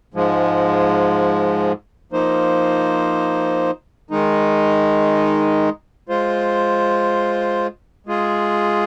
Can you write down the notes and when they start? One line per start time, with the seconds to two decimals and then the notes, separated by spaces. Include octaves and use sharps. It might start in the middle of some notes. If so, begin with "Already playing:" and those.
0.14 G#2 F3 G#3
2.12 F3 A#3 D#4 C5
4.10 D#3 G#3 D#4
6.09 G#3 F4 C5
8.06 G#3 F4 G#4